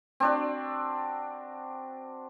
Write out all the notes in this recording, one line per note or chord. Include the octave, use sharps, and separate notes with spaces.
C4 D4 F#4